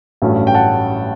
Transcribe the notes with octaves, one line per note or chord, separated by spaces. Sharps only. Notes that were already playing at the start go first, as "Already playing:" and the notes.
A1 G2 F#3 A3 C#4
G5
F#5 A5